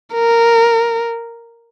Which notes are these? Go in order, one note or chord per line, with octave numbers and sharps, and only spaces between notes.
A#4